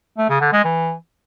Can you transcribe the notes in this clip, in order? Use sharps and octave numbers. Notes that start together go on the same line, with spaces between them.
A3
C#3
D3
G#3
E3